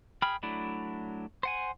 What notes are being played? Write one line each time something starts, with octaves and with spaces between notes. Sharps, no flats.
G#4 G5 B5 F6
F#3 A3 D4 E4
C5 F#5 G#5